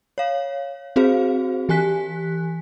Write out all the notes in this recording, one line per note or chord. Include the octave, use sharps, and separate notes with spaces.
C#5 F5
C4 F#4 G#4 C5 F5
E3 G4 G#5 F#6 B6